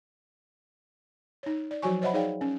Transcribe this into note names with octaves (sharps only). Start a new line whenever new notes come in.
D#4 C#5
D5
F3 F#3 F#4 C#5 G#5 C#6
C5 C#5 D#5 E5 F#5 B5
D#4 G#4 C#5 D5 F5 G5
C#4